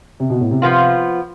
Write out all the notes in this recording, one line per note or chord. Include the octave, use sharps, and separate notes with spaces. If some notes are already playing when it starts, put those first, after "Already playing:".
C3
B2
A2
C3
F3 B3 F4